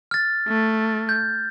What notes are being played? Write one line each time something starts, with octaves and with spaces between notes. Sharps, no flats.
F6 A6
A3
G6